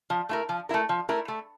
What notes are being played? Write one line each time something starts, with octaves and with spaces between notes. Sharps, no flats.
F3
A3 E4 A#4
F3
A3 E4 A#4
F3
A3 E4 A#4
A3